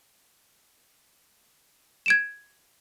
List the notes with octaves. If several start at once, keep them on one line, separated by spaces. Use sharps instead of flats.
G#6 D7 E7